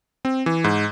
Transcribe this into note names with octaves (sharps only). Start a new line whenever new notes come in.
C4
E3
G#2